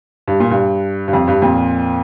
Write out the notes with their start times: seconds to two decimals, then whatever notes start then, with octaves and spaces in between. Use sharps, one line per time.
0.28 G2
0.40 A#2
0.51 G2
1.08 G2
1.13 F2
1.28 G2
1.42 F2 A#2